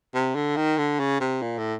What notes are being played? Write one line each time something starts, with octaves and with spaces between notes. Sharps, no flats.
C3
D3
D#3
D3
C#3
C3
A#2
A2